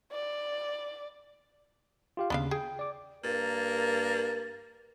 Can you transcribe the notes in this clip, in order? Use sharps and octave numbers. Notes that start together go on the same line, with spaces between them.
D5
F4 G4 F5
D#2 C#3 B3 D4 F5
G#4 G5
D5 D6
G2 A#3 A#4 A6